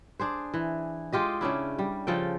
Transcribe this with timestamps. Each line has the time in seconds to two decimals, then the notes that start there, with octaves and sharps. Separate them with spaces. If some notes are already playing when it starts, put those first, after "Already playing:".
0.20 D4 G#4 C5
0.54 E3
1.13 G#3 F4 G4 D#5
1.41 C#3 C#4 D4 E4
1.79 G3
2.07 C#3 F3 A4 G5